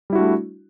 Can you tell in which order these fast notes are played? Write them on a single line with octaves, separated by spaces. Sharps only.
G3 E4 F#4 D4 A3